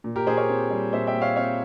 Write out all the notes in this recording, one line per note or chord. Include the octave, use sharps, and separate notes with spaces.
A#2
G4 A#4
A#2 G#4 C5
A#4 C#5
C4
G3
A#2 C5 E5
E5 G5
A#2
C#5 F5
C4 C#5 F5